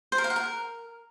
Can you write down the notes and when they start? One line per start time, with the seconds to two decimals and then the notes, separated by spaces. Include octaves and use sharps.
0.12 C5
0.18 A#4
0.24 F5
0.30 F#5
0.36 A#4